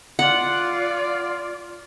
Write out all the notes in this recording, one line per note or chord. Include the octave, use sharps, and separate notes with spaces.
F4 D5 F#5